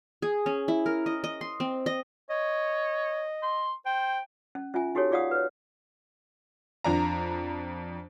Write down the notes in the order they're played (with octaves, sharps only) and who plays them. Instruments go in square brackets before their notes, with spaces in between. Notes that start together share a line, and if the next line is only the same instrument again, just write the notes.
[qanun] G#4
C#4
E4
A#4
D#5
D#5
C6
C4
D#5
[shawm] C#5 [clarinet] D#5
[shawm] C6
[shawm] C5 [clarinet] G5
[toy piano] C#4
C#4 F4 E5 G#5
D#4 F#4 G4 A4 C#5
F4 G#4 D5 F5 F#5 D#6
B4 C#5
[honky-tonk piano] F2 D4 A#5